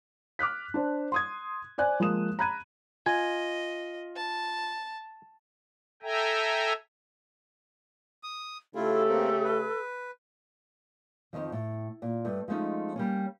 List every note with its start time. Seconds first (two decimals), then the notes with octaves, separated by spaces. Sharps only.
0.39 D6 F6 F#6 B6
0.74 D4 C5
1.12 C6 D#6 G#6
1.78 C5 D5 G#5 F#6
2.00 F3 G#3 A#3 D#6 E7
2.39 A#5 B5 F#6 G#6 D#7
3.06 F4 D#5 G#5
4.16 A5
6.03 A4 E5 G5 G#5 A#5
8.23 D#6
8.75 C#3 A3 E4 F4 G4 A4
9.08 A#3 C4
9.44 B4
11.33 F2 G#2 D#3 F3
11.52 A2
12.02 A#2
12.25 G2 A3
12.48 F3 G#3 A3 C#4 D#4
12.96 G3 A#3 C#4